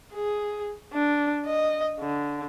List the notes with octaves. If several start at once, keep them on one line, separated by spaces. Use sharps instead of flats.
G#4
D4
D#5
D3